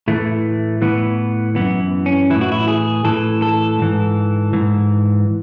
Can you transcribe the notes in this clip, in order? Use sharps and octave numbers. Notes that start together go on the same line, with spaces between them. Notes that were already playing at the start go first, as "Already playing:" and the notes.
A2 E3 A3
A2 E3 B3
F#2 E3 B3
C#4
A2 E3 E4
F#4
E4
G#4
A2 E3 A4
A4
G#2 E3
G#2 E3